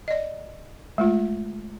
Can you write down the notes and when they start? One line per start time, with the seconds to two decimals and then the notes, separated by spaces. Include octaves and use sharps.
0.08 D5 D#5
0.98 G#3 A3 F4